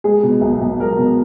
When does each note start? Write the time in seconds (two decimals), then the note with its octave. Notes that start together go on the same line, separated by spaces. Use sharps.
0.04 G#3 G#4
0.23 B2
0.41 B1
0.61 B1
0.79 G#3 A#4
0.98 B2